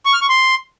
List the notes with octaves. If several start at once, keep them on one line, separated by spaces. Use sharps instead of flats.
C#6
F6
C#6
C6